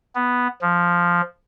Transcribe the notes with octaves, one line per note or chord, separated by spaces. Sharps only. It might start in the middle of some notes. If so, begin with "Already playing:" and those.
B3
F3